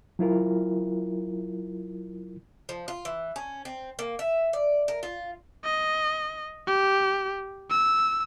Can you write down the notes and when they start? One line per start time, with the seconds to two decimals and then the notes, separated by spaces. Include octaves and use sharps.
0.19 F#3 E4 F4 A#4
2.69 F3
2.88 F4
3.05 E3
3.36 C#4
3.65 C4
3.99 A#3
4.19 E5
4.53 D5
4.88 A#4
5.03 F4
5.64 D#5
6.67 G4
7.70 E6